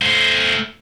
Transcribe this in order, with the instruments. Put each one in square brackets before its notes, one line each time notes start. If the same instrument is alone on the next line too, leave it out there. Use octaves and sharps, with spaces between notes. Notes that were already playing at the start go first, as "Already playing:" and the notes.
[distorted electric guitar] A3 C5